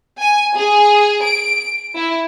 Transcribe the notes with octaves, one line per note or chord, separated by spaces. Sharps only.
G#5
G#4
D7
E4